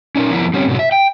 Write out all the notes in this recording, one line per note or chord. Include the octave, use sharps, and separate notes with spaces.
C#4 D#4 A#4
F2 F3 B3 E4 A#4
G3 C4 C#4
G#2 B2 F#3
E5
G5